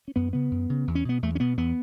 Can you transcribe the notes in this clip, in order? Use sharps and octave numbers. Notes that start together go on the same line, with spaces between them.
C#4
F#2 B3
C#3 B3
F#2
C#3
E2
C#4
B2 B3
E2 A3
C#4
B2 B3
E2 B3